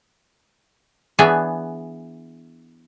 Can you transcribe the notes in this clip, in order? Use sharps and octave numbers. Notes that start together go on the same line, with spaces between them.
E3 B3 D4 G#4 C#5 D5